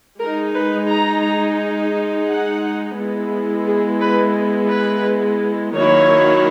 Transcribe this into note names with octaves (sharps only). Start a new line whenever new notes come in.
G#3 D#4 A#4
B4
A#5
F#5
G#3 B3 E4
G#4
B4
B4
D#3 F#3 A#3 E4 C#5